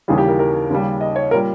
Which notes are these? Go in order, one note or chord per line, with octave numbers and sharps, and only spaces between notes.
D#2 C#3 E3 G3 G#4
G4
A#4
A#4
D#2 C#3 G3
D#5
C#5
A#2 G3 A#4